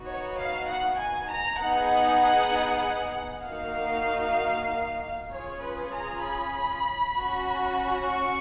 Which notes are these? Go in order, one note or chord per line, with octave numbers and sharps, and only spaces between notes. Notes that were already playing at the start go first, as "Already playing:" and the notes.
Already playing: B3 D#4 F#4
C#5
F5
F#5
G#5
A#5
B3 D#4 G#4 F#5
A#3 D#4 F#4 F5
C#4 F4 G#4 C#5
B4
A#5
B5
C#4 F#4
C#6